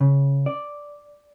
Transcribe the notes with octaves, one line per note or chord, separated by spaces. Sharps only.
C#3
D5